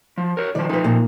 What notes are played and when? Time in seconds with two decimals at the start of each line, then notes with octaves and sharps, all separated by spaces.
0.18 F3
0.37 A#4 C#5
0.55 D#3 F3 D5
0.69 F3 D#4 A#4 B4
0.84 A#2 A#3